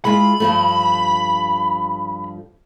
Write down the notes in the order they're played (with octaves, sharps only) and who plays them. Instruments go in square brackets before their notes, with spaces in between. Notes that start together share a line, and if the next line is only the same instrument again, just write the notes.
[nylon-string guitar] G#3 E4 F4 [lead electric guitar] B5
[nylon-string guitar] G2 F3 A3